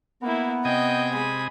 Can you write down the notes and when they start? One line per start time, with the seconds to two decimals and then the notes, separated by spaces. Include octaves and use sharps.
0.22 A#3 B3 E4
0.65 C3 D#5 G5 G#5 D#6
1.13 G#3 B5